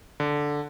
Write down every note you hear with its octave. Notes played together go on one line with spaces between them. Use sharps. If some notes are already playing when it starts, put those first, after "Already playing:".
D3